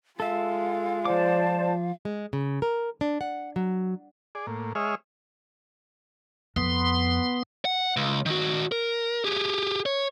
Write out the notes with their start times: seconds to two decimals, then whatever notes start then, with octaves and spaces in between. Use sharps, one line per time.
0.20 G#3 F4 A4 E5 F5
1.05 F3 C5 D5 A5 D6
2.05 G#3
2.33 C#3
2.62 A#4
3.01 D4
3.21 F#5
3.56 F#3
4.35 G#4 D5
4.47 A2 A#3
4.75 G#3 G#4 C#5 D#5 E5 F6
6.56 F2 B3 C6
7.65 F#5
7.97 C#2
8.26 D#3 F#4
8.72 A#4
9.25 G4 G#4
9.86 C#5